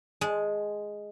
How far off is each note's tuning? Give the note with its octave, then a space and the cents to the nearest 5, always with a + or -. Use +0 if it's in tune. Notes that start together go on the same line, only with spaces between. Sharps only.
G#3 +0 A5 -25